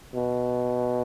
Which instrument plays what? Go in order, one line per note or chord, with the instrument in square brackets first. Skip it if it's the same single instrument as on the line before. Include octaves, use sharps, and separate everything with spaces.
[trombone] B2